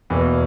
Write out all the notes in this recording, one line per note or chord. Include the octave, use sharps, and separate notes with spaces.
E2 B2 A#3